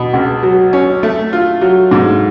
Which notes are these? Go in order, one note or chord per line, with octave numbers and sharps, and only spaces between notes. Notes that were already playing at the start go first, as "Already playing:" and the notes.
Already playing: B2
C#2
F#3
C#4
A3
F4
F#3
G#2